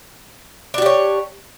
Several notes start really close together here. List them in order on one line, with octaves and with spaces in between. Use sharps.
D4 F#4 G4 C#5